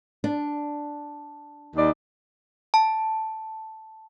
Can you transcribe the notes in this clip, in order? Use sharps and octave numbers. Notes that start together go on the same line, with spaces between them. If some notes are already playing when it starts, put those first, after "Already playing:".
D4
D#2 D#4 D5
A5